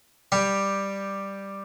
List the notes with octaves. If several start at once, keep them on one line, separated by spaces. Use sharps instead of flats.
G3 G4